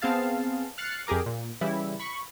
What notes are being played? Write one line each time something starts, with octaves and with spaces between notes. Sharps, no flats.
B3 C4 G#4 F5 A5
F6 F#6 A6 C7 C#7
F2 G4 G#4 A#4 D6
A#2
C#3 E3 G3 E4
B5 C#6